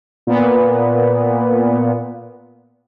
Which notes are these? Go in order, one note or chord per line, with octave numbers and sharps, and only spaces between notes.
A#2 B3